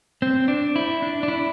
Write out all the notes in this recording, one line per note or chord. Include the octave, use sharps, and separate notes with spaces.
C4
D4
E4
D4
D4
E4